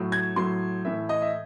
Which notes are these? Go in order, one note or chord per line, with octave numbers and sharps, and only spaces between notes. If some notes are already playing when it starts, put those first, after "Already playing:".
Already playing: A2 F#3
G#6
A2 F#3 C6
A2 E3 E5
D#5
E5